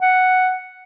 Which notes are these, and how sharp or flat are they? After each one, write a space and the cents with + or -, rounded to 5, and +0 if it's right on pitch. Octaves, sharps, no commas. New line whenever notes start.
F#5 +0